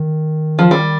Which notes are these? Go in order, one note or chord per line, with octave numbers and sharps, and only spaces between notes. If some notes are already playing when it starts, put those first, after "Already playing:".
Already playing: D#3
F3
G3